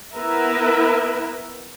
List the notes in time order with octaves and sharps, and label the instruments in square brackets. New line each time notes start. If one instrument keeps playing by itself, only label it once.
[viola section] B3 E4 A#4 B4 E5